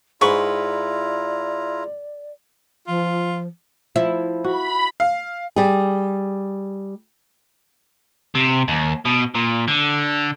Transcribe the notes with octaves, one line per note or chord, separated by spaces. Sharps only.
G#2 E4 F4 B4 D5 A#5 C#6
F3 F4
F3 E4
F#4 B5
F5
G3 G#4
C3
D#2
B2
A#2
D3